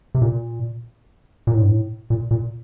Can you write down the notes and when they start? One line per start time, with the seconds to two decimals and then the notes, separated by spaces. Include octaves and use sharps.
0.15 C3
0.22 A#2
1.47 A#2
1.54 A2
1.62 G2
1.69 A2
2.10 A#2
2.31 A#2